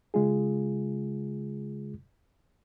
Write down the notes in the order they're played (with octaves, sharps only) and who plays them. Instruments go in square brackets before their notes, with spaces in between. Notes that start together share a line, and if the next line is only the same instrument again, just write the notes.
[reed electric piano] C#3 G#3 F4 G#4